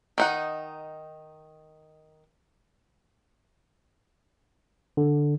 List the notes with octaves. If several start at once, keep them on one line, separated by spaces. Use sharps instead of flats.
D#3 D#4 F#5
D3